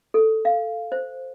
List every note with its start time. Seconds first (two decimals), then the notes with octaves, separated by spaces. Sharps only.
0.14 A4
0.45 F5
0.92 C5